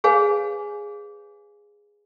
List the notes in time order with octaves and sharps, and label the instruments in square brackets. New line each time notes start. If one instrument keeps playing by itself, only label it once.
[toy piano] G#4 B4 C#5 F5 G#5